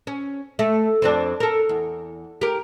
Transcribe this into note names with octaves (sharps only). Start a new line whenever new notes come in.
C#4
A3
F2 C4 D4
A4 A#4
E2
G4 A#4